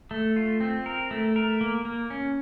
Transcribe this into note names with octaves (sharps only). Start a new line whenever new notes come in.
A3
F4
C4
A#4
A3
A#4
A#3
A#3
C#4